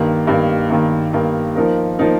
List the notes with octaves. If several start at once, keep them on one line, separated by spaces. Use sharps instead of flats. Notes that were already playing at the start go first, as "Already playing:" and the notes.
Already playing: G2 D#3 A#3
G2 D#3 A#3
G2 D#3 A#3
G2 D#3 A#3
F3 A#3 D#4 A#4
F3 A#3 D#4 A#4